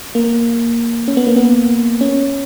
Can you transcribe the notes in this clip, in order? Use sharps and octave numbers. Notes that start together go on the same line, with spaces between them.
A#3
C#4
B3
A#3
B3
C#4